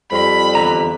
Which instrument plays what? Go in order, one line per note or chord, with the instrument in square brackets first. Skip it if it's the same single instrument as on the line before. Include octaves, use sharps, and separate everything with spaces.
[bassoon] F2 [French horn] G3 [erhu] B5
[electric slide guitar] E2 D3 A#5